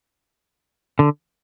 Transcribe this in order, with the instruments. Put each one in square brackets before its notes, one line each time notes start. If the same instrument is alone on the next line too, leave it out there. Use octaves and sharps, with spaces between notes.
[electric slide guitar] D3